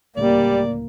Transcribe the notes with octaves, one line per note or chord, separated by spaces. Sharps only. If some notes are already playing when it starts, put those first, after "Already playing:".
D1 C#2 A2 G3 A#3 D5